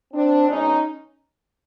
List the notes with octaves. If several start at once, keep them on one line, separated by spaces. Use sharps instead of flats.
C4 D4
B2 G#3 C#4 D#4